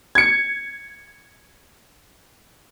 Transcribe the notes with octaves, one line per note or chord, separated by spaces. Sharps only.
G#6 C#7